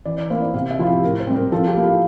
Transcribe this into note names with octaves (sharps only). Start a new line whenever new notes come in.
E3 D5
D5
A#3 E4 C5
D5
C3 F5
E5
F3 C4 E4 F4
G4
A2 A#4
C5
G3 C4
A#4
F3 A4
G4
A#3 E4
F4